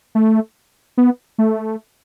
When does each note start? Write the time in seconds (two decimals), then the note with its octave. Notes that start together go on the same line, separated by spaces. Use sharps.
0.15 A3
0.97 B3
1.38 A3